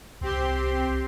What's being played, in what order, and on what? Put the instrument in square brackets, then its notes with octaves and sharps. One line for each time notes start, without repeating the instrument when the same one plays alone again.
[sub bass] C2 [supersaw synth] C4 G4 C6